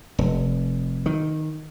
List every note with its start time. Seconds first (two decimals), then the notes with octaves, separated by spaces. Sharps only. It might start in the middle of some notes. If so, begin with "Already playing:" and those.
0.18 F1
1.06 D#3